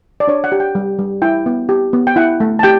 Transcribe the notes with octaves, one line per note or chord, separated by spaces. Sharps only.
D5
D4 C#5
F#5
G4
G5
G3
G3
E4 G5
B3
G4
B3
G5
E4 F#5
A3
A5
G4 G5